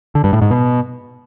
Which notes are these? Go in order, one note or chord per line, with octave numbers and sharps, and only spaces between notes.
D3
G2
A2
G#2
B2